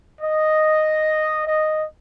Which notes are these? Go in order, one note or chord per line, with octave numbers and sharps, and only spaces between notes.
D#5
D#5